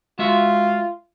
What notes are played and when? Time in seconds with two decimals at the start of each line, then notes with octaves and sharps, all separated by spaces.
0.19 G#3 F4 F#4 E5